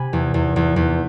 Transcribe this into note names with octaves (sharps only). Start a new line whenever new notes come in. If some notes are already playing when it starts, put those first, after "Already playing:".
Already playing: C3 G#5 B5
E2
E2
E2
E2